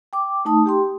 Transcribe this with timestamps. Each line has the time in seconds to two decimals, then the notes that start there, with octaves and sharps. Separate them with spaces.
0.13 G5 D6
0.45 A3 D#4 A5 D#6
0.66 G4 G5 C6